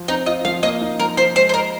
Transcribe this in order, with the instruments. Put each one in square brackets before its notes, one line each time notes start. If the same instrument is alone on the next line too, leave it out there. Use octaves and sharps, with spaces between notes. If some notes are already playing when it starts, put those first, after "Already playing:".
Already playing: [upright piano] F3
[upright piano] C4 [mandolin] D#4
[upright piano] F4 [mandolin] D#5
[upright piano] F3 [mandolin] F5
[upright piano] A#3 [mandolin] D#5
[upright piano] D#4
[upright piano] F3 [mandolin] A#4
[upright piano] F3 [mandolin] C5
[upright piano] G#3 [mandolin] C5
[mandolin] C5
[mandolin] A#4 [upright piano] D#5